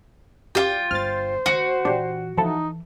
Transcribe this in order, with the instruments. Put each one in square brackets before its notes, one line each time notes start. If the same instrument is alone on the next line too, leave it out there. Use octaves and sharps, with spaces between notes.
[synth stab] F#2 G4 D5 [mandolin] F4 G5
[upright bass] G1 G2 [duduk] C5 [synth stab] F6 A6
[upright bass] D#3 A#3 [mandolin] F#4
[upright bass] A#2 E3 [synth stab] D4 G4
[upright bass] E3 [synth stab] F3 E4 A4 [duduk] D#4